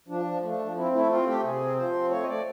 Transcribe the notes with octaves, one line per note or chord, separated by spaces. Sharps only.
F3 D4
F3
A3 D4
F3
C4 E4
A3 E4
C4 F4
A3 G4
C3 G#4
C4
F3 C5
C4
A3 C#5
D#5
A3 D5